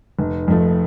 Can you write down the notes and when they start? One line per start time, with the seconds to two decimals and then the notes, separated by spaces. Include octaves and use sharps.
0.19 F1
0.48 F2 F3 A3